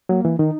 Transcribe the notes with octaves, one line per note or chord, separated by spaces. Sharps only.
F#3 A#3
E3
D#3 D#4